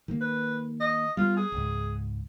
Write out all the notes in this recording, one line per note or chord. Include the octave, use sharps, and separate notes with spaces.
D#3 A#3
B4
D#5
G3 B3 F4
G#4
C#2 G#2